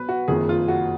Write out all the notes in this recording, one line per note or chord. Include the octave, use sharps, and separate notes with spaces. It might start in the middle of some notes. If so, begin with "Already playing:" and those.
Already playing: B1 B2 B4
F#4
F#1 F2 D#3 G#4
F4
F#4